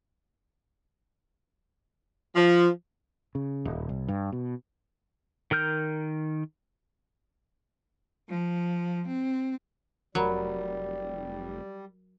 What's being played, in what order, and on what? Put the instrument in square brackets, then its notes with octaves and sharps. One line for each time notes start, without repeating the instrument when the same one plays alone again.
[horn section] F3
[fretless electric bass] C#3
D#1
C2
G2
B2
[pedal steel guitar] D#3 A#4 F6 G6
[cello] F3
C4
[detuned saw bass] F1 [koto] F#3 [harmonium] G3 [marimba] A#4 A#5 B5